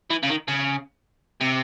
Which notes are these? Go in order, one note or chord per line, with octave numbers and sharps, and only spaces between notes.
E3
C#3
D#3
C#3
C3